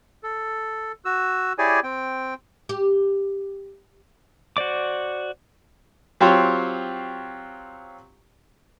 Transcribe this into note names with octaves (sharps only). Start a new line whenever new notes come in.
A4
F#4 E6
E4 G4 G#4 C#5 D5 G#5
C4 G5
G4
F#4 C5 D5 D6
F#3 C4 F4 G4 C5 C#5